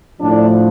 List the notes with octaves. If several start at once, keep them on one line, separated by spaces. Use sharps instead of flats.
A2 F3 D4